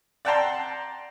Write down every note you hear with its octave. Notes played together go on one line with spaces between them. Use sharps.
D5 F#5 G5 A5 A#5 C6